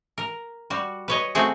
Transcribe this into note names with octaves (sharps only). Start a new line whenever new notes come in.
A#4
G3 F#4
B4 C#5 D#5
A3 C4 F#4 G#4